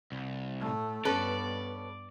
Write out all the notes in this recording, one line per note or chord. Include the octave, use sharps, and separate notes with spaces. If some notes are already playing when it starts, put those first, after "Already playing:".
C2
A2 A3
G2 B3 C#4 A4 B4 D5